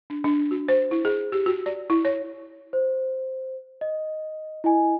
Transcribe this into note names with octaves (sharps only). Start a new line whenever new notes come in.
D4
D4
F#4
C5
E4
G#4
G4
F#4
D5
E4
C#5
C5
D#5
E4 D#5 G#5